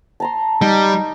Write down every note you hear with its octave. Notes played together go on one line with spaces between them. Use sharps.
A5 A#5 C6
G3 D#4